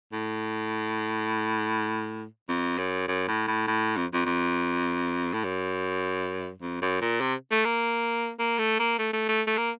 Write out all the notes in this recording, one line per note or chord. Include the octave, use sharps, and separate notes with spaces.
A2
F2
F#2
F#2
A2
A2
A2
F2
F2
F2
A2
F#2
F2
F#2
A#2
C3
A3
A#3
A#3
A3
A#3
A3
A3
A3
A3
A#3